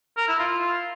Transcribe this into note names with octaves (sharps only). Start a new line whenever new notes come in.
A#4
E4
F4